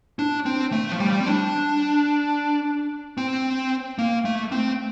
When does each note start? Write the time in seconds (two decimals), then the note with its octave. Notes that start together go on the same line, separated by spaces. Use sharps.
0.19 D4
0.46 C4
0.72 A3
0.92 F3
1.00 G3
1.20 C4
1.26 D4
3.17 C4
3.99 A#3
4.25 A3
4.52 C4